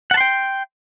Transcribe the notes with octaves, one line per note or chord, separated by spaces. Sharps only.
F#5 G5 A5 C6